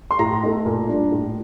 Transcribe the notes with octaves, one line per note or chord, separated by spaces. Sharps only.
C6
A2 A#5
A3 D#4
A#2
G3 D4
A2